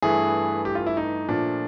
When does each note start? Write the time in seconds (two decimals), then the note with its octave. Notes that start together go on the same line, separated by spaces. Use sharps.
0.02 G2 E3 A3 G#4
0.65 G4
0.75 F4
0.86 E4
0.97 D#4
1.29 A#2 F3 A3 D4